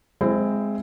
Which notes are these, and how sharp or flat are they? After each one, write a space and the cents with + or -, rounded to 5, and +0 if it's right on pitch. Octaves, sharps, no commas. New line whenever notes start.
G#3 +0 C4 +0 E4 +25